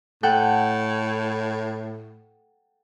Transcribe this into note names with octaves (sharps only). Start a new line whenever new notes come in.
A2 A4 F#5 G5